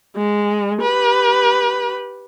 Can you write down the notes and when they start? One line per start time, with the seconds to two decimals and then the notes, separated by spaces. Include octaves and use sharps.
0.16 G#3
0.82 G4 B4